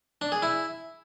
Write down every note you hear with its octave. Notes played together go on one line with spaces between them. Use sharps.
D4
G#4
E4